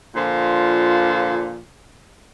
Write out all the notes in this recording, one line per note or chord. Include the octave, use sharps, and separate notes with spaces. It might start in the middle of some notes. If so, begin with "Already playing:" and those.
A#2 D3 F3